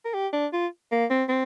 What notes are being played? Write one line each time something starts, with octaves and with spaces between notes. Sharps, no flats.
A#4
G4
D4
F4
A#3
C4
C4